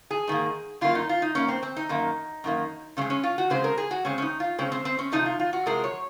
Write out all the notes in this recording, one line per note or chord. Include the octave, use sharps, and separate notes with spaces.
G#4
G#2 D#3 A#3
F#2 D#3 A#3 F4
D#4
F4
D#4
F#2 D#3 A#3 C#4
C4
C4
D#4
F#2 D#3 A#3
F#2 D#3 A#3
C#3 G#3 C4 C#4
C#4
F4
F#4
C#3 G#3 C4 C5
A#4
G#4
F#4
C#3 G#3 C4 C#4
C#4
D#4
F4
C#3 G#3 C4 C#4
C4
C4
C#4
C3 F3 G#3 D#4
F4
F4
F#4
C3 F3 G#3 A#4
C#5